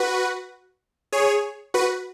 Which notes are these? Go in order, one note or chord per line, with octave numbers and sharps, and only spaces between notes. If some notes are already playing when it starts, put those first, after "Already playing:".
Already playing: F#4 B4
G#4 C#5
F#4 B4